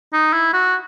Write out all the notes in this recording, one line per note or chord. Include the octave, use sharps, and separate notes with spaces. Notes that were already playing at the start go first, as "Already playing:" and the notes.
D#4
E4
F#4